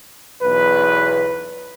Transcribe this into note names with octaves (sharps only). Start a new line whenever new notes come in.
B1 E2 B4